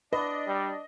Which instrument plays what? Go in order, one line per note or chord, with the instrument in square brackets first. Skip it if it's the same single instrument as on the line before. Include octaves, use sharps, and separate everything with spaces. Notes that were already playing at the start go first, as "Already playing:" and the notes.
[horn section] D4 D5 [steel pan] B4 [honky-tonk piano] D#5
[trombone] G3